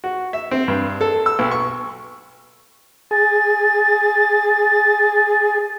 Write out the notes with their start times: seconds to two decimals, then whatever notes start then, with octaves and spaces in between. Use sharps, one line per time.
0.04 F#4
0.33 E5
0.51 C4
0.68 G2
1.01 A4
1.26 E6
1.39 B1
1.51 C#6
3.11 G#4 A6